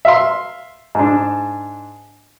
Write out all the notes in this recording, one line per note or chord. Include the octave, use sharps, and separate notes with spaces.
E5 F5 C6
G#2 D4